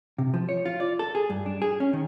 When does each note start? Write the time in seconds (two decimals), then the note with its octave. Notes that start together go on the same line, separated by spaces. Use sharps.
0.18 C3
0.34 F3
0.49 C#5
0.66 F4
0.80 D5
0.99 A4
1.15 G#4
1.30 G2
1.46 D4
1.62 G#4
1.80 C#4
1.93 D#3